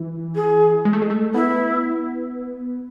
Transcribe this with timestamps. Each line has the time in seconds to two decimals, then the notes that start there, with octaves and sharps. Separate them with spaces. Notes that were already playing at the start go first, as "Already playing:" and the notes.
Already playing: E3
0.35 G#4
0.85 G#3
0.93 A3
1.02 G#3
1.10 A3
1.34 B3 E4